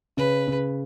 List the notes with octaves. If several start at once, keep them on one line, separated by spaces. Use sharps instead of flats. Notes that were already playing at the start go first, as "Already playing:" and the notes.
C#3 B4
C#3